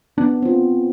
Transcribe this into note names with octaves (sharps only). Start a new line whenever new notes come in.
B3 D4
C4 F4